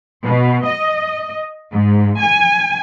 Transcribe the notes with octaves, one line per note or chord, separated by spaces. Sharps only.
B2
D#5
G#2
G#5